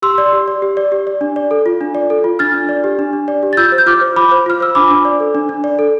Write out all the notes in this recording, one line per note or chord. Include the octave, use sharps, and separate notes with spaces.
G4 C6 E6
D5
G4
D5
G4
D5
G4
D5
D4
D5
A4
F4
D4
D5
A4
F4
D4 F6 A6
D4
D5
G4
D4
D4
D5
G4
A6
F4 E6 G6
C5
G6
F4 D6 F6
C5
F4 B5 D6
C5
F4 F6
C5 E6
D4 B5 D6
D4
D5
A4
D4
D4
D5
A4